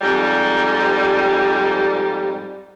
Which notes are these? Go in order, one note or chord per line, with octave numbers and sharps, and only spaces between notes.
F2 G#2 G3